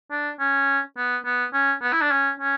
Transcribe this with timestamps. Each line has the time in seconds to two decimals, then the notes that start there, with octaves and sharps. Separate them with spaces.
0.11 D4
0.39 C#4
0.97 B3
1.25 B3
1.53 C#4
1.82 B3
1.93 E4
2.02 D4
2.11 C#4
2.40 C#4